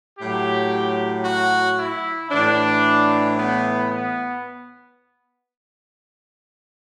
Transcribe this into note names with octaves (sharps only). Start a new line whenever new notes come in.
A2 F#3 G4
F#4
E4
A2 E3 D4
B3
B3